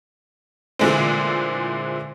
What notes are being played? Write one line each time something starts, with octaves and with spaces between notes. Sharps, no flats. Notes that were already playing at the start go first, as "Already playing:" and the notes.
A#2 D3 E3 G#3 A3 C4